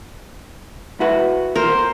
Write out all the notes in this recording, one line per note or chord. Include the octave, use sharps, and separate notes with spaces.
E4 F#4 B4
A#4 C5